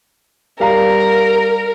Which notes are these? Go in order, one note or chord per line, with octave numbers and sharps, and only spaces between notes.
G3 A#4 F5 A#5